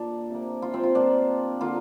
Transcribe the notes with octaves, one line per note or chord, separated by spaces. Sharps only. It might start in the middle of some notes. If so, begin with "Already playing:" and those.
Already playing: A#2 A#3 D4
C3 A#3
F4
C4
F4
A#2 A#3 D4
D3 A#3 F4